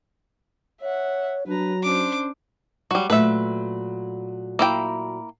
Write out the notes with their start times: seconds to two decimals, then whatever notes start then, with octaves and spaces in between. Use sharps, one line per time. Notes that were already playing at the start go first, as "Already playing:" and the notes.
0.82 C#5 E5 F#5
1.47 F#3 D4 B4 A#5
1.83 C#4 D4 C5 D6
2.91 F#3 G3 F#4
3.10 A#2 F#3 A3 B4 E5
4.59 A#3 E4 G5